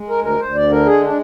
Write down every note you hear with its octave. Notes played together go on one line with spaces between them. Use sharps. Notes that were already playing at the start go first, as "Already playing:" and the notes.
Already playing: G#3
A#4
D2
A#4
D2 C5
D5
D3
A#4
G#3 G#4
D4